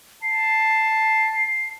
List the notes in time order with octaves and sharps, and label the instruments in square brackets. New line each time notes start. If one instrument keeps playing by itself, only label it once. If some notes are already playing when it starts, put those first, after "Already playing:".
[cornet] A5 [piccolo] C7